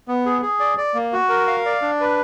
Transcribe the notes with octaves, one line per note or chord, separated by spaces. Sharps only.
B3
G#4
G#4
D5
D5
A#3
F#4
A#4
F5
D5
D4
B4